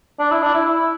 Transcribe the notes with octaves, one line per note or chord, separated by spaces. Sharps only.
D4
E4
D4
E4
E4